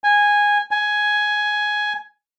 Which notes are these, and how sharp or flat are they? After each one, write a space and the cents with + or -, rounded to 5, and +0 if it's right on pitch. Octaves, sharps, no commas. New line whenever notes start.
G#5 -10
G#5 +10